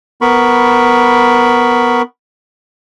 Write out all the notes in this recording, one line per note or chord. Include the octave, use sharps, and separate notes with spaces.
B3 A#4 B5 C#6